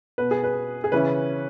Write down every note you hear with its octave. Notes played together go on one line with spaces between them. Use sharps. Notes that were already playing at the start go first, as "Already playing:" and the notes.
B2 B3 B4
G#4
B4
G#4
C#3 E3 C#4 B4